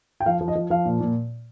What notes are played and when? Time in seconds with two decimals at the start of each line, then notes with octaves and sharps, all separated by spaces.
0.20 G5
0.26 F3 F5
0.41 F3
0.48 D#5
0.55 F3
0.70 F3 F5
0.85 A#2
1.00 A#2